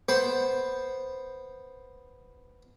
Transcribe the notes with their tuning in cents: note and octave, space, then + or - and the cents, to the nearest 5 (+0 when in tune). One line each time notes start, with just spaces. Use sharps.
B3 +0 C5 +0